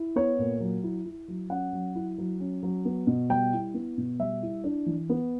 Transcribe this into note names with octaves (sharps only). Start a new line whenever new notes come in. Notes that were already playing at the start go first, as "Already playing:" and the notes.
Already playing: E4
B3 C#5
A#2
F#3
E4
E4
F#3
C#4 F#5
F#3
E4
F#3
C#4
F#3
B3
B2
G3 G5
E4
B3
B2
G3 E5
E4
D4
E3
B3